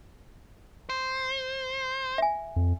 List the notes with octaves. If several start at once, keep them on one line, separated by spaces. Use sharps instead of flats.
C5
E5 G#5
F2